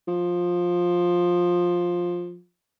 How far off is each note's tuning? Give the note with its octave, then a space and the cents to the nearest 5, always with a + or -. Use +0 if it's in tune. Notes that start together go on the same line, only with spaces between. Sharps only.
F3 +10